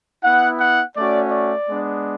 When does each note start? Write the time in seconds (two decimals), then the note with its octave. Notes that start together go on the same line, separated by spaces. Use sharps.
0.24 B3 E4 F#5
0.60 F#5
0.96 A3 C#4 F#4 D5
1.31 D5
1.68 G#3 B3 D4